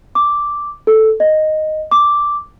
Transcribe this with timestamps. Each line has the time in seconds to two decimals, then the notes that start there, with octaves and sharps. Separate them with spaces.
0.15 D6
0.87 A4
1.20 D#5
1.92 D6